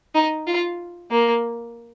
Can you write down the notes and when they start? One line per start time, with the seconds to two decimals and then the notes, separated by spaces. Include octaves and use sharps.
0.14 D#4
0.47 F4
1.11 A#3